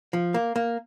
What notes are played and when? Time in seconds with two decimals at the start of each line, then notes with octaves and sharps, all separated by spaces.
0.13 F3
0.34 A#3
0.56 A#3